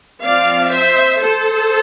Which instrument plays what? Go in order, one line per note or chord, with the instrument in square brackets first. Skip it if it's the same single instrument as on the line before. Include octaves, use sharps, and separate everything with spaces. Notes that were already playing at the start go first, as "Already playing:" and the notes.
[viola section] F3 C4 D5 F5
C5 E5
A4 C5